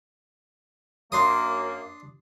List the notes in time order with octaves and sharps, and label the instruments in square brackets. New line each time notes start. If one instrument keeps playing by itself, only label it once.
[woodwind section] F#2 A#3 [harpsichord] D4 C6 D#6